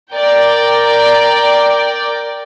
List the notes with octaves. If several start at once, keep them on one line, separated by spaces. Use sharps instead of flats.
A#4 D5 G5